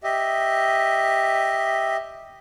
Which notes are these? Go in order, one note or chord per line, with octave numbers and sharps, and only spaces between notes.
G4 D#5 E5